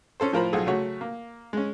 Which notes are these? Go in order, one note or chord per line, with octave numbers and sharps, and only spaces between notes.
C#4 A4 C5
A2 F3 F4 A#4 C5 B5
B1 F4 G#4 A4
C#3 F#3 A3 F#4 C#5 F#5
A#3
G#3 C#4